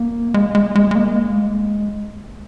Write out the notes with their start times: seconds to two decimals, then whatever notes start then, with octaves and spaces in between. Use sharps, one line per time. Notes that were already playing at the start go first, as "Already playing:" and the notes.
Already playing: A#3
0.34 G#3
0.55 G#3
0.75 G#3
0.91 G#3
0.95 A#3
1.16 G#3